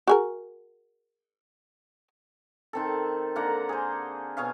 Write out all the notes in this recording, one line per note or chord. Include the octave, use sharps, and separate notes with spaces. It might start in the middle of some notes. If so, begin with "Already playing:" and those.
F#4 G#4 A#4
D#3 C4 A4
D3 A#3 F#5 A#5
G#4 C5
B2 G#4 C#5 F5